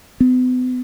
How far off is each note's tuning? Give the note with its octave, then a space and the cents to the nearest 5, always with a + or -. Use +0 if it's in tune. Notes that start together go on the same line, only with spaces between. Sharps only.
B3 +40